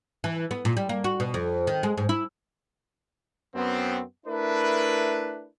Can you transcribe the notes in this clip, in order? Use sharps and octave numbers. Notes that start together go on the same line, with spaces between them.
E3
B3
A#2
G3
A#3
F#4
B2
F2
D#3
G#3
G#2
E4
F#2 B3 C4
A3 D4 E4 A#4 B4